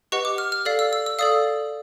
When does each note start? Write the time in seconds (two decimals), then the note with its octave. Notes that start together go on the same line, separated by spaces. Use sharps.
0.12 G4 B4 D#5 F#5 C#6
0.25 D6
0.38 F6
0.52 F6
0.65 A4 D5 F5
0.79 E6
0.93 E6
1.06 E6
1.19 A4 D5 F5 D#6